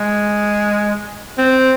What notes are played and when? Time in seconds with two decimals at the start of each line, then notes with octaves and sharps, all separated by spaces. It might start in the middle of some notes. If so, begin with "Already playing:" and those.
Already playing: G#3
1.38 C4